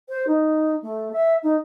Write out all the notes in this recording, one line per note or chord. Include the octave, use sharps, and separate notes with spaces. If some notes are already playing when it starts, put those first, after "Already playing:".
C5
D#4
A3
E5
D#4